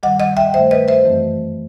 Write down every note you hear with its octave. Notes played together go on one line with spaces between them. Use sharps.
G2 D#3 G3 D#5 F#5
D#5 F#5
E5 G5
G2 D#3 A3 C5 E5
B4 D#5
C5 E5
F#2 E3 A3 C4